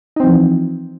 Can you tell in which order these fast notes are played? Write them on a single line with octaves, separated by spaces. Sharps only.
D#4 C4 F3 E3